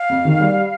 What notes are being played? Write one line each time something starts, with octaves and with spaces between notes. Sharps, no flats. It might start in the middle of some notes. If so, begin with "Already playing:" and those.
Already playing: F5
F2
D#3
G3